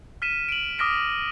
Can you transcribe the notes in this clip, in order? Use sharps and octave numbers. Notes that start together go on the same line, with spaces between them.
F6 B6 D#7 E7
D7 F#7
D6 D#6 F6 A#6 B6 D7